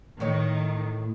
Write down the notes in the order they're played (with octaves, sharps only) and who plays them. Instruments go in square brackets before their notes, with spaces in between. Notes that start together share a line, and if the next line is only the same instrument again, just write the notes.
[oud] A2 C#5 [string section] D#3